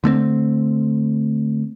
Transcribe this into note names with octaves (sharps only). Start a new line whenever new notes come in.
D3 A3 A#3 C4